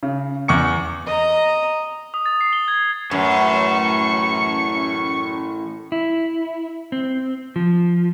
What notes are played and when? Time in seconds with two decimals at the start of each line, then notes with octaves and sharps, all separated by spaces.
0.03 C#3
0.48 E2 C#6 C#7
1.06 D#5 A#5
2.14 D#6
2.26 A6
2.41 C7
2.53 G7
2.68 G#6
3.11 F#2 A2 E3 C#6
5.92 E4
6.92 C4
7.56 F3